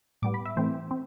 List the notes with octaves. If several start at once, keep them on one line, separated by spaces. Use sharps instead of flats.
A2 G3 B3 D6
B5
E5
A2 E3 A3 C4 C5
C4